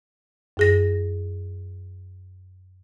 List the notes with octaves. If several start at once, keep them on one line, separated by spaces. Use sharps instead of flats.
F#2 G#4 A#6